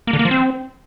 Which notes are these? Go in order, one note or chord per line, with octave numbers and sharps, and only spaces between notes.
A#3
D3
A#3
F3
C4